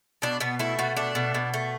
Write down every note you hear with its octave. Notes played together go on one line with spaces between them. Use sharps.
B2 D4
B2 B3
A3 E4
B2 F#4
A3 D4
B2
B2
A3